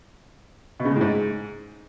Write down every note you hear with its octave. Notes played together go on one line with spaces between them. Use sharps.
B2
C#3
G#3
A2
G#2